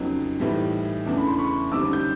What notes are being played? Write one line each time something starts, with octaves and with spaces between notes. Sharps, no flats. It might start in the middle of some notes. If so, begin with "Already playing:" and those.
Already playing: F2 C#3 F#3 B3 D#4
A2 E3 G3 C4 D#4
E2 C#3 E3 A3 D4
B5
C6
B5 C#6
F#2 D3 G3 C4 D#4 D6 E6
G6